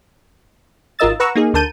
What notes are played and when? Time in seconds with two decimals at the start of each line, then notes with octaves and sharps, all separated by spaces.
0.99 G#1 F4 A#4 D#5 E6 A6
1.20 B4 F#5 A#5 C#6 E6
1.35 A#3 D#4 G#4
1.53 D2 D3 A#4 A5 G6 D#7